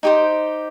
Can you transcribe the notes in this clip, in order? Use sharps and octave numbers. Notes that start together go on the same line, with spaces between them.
D#4 G4 C5 G5